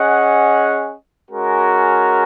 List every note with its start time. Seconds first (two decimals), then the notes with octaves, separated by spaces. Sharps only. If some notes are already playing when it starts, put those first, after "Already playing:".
Already playing: C#4 G#4 D#5 F#5
1.30 G#3 C#4 F#4 A#4